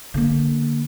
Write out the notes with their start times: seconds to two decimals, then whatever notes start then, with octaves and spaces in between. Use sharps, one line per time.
0.14 D3 A#3